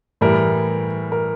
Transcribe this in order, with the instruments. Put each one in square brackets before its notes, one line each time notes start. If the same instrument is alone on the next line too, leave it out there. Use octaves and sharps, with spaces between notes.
[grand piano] A2 E3 G3 A#4
A#4